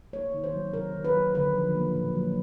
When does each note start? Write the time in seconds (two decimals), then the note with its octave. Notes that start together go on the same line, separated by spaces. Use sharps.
0.13 A#3 C#5
0.34 D#3
0.44 C5
0.54 F#3
0.74 C3 A#4
0.94 D#3
1.05 B4
1.14 F#3
1.35 D3 B4
1.55 F3
1.75 A#3
1.95 A#2
2.15 F#3